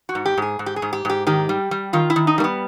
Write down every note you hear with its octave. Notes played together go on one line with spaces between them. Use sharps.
F#4
G#2
G4
G#2 G#4
G#2
G4
G#4
G#2
G4
G#2 G4
D#3 G4
G3
G3
D#3 F4
E4
D#3
D#4
G3 A#3
B3